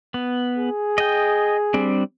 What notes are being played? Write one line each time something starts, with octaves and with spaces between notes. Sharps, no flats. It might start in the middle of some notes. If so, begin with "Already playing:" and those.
B3
G#4
D#5 G5
G3 C4 D4